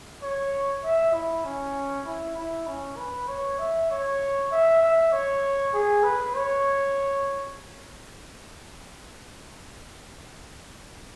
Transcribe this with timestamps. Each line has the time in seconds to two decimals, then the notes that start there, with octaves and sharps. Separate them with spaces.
0.22 C#5
0.84 E5
1.13 E4
1.45 C#4
2.06 E4
2.37 E4
2.67 C#4
2.97 B4
3.28 C#5
3.59 E5
3.90 C#5
4.51 E5
4.82 E5
5.12 C#5
5.74 G#4
6.04 B4
6.34 C#5